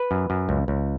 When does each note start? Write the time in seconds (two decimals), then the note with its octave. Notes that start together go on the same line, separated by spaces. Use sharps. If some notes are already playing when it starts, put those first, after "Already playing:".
Already playing: B4
0.11 F#2
0.30 F#2
0.49 C#2
0.68 C#2